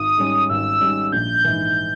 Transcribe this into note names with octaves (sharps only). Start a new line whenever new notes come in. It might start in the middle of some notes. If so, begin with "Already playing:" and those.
Already playing: G#1 D#6
G#2 G3 C#4
G#1 E6
G#2 G3 C#4
A#1 G6
G#2 E3